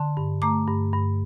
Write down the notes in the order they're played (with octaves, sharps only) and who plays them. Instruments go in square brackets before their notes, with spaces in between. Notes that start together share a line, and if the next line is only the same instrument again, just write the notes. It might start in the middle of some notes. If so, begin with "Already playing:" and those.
Already playing: [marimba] D3 A5 C6
G2
A3 A#5 D6
G2
G2